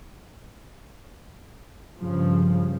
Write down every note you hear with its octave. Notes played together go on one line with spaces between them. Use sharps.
G2 C#3 F3